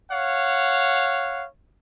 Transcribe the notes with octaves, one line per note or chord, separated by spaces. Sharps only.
C#5 F5 F#5